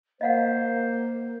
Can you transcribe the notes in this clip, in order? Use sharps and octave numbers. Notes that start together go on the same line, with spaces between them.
A#3 C5 D#5 F5 F#5